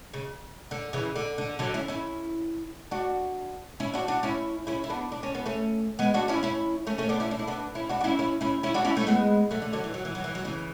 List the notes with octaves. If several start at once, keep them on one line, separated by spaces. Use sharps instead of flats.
C#3
D3
C#3 E3
D3
D3
D3 F#3
C#4 E4
C#4 E4
D4 F#4
C#4 E4
D4 F#4
D4 F#4
C#4 E4
C#4 E4
E4
B3 D4
D4
C#4
B3
A3 C#4
G#3 B3
D4 F#4
C#4 E4
C#4 E4
A3 C#4
A3 C#4
B3 D4
C#4 E4
D4
E4
B3 D4
C#4 E4
D4 F#4
F#4
C#4 E4
C#4 E4
C#4 E4
C#4 E4
D4 F#4
C#4 E4
A3 C#4
G#3 B3
F#3 A3
D3
D3 F#3
E3
F#3
E3
F#3
E3
F#3
C#3 E3